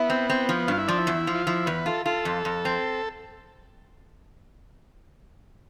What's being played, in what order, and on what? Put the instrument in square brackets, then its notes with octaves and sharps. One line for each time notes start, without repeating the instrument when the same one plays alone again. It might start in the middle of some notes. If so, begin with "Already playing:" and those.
Already playing: [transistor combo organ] B3 [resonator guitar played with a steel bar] E4
[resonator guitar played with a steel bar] C4
C4
F3
[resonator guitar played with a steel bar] G2 [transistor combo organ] F4
[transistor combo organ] E4
[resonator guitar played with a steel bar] F3 [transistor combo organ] D4
[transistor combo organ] E4
[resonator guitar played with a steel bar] E2
F3
[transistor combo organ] F4
[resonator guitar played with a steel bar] F3 [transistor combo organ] E4
[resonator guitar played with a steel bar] E2 [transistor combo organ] B4
[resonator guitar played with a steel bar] F4 [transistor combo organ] A4
[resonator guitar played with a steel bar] F4 [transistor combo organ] A4
[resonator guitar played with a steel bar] F2
F2
C4